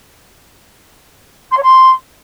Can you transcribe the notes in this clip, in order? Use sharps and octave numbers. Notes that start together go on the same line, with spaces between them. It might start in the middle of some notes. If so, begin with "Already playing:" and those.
C6
C#5
C6